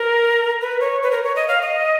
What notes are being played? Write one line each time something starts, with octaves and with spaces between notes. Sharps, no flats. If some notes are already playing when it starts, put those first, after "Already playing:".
Already playing: A#4
B4
C#5
B4
A#4
C#5
D#5
F5
D#5